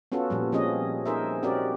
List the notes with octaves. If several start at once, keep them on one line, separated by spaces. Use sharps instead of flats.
B3 C#4 F4 F#4 A4
A#2 F3 G3
F3 C4 C#4 G#4 D#5
D#4 G#4 A#4 C5 E5
C4 C#4 F#4 G4 A#4 D5